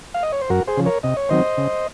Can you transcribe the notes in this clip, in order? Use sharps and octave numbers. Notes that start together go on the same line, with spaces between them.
F5
D#5
C#5
C5
F#2 F#4 A#4
G#4 C5
C#3 F3
A#4 C#5
C3 D#5
C#5
D#3 F#3 C4 C5 D#5
C#3